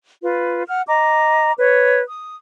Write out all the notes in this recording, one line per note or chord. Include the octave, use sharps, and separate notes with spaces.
F4 B4
F#5 F6
D#5 A#5 D6
B4 C#5
D#6